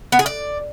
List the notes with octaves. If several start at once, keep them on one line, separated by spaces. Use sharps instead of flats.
B3
G#4
D5